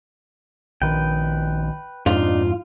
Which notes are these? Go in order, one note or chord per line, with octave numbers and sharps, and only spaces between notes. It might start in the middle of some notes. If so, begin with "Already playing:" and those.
A#1 D#3 B4 G5
F2 G#2 D4 D#4 F4